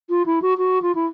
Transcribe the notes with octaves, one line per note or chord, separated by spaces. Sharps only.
F4
E4
F#4
F#4
F4
E4